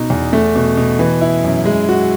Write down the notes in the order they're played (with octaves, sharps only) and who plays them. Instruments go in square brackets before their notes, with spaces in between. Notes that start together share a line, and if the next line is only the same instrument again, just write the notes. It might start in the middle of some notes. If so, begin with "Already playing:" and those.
Already playing: [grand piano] B2 D#4
E2
A3
B2
B2
E3
E4
F#2
G#3
F#4